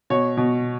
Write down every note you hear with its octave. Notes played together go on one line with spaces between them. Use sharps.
B2 C#5
B2